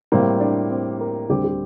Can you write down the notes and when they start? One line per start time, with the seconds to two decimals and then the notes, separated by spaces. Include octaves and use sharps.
0.12 A2 G3 A#3 C4
0.40 D4
0.70 C4
1.01 A#4
1.29 D2 D3 G3 C4 G4
1.44 G4